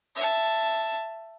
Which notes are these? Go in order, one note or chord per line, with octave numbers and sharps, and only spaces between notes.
E5 A5